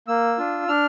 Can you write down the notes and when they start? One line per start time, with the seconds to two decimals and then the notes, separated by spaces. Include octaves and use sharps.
0.08 A#3 E6
0.38 D4 F4
0.68 D4 F6